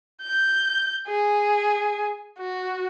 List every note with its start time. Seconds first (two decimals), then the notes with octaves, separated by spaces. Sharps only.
0.22 G6
1.08 G#4
2.39 F#4